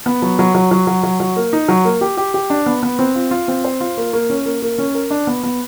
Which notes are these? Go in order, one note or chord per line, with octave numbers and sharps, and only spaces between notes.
B3
F#3
F#3
F#3
F#3
F#3
F#3
F#3
A#3
D#4
F#3
A#3
G4
G4
G4
D4
B3
B3
C4
F4
F4
C4
C5
F4
A#3
A#3
C#4
A#3
A#3
C#4
A#4
D4
B3
B3